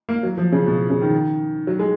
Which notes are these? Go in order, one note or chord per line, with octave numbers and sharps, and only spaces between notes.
A#3
F#3
F3
C#3
B2
C#3
D#3
F#3
G#3